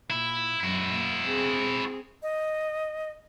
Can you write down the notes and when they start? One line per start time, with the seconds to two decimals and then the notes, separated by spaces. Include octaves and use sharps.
0.10 A#2 E4
0.61 F#2 F#3 E4 F#4
0.93 A#3
1.25 C4 G#4
2.23 D#5